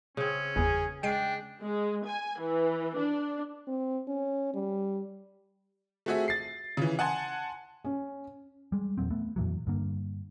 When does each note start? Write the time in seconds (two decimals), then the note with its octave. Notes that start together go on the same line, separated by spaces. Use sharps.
0.17 C#3 C4 C#4
0.56 G1 E2 G#4 B4
1.03 G#3 D4 G5 C7 D7
1.61 G#3
2.05 G#5
2.41 E3
2.97 D4
3.68 C4
4.08 C#4
4.54 G3
6.06 A3 C4 F#4 G#4 E5
6.28 A6 C7
6.77 C#3 E3
6.99 F#5 G#5 A5 C6
7.84 C#4
8.72 G3 G#3
8.98 E2 A#2 F#3 C4
9.10 A3 B3
9.36 F2 A#2 E3 F#3
9.67 G2 D3 A#3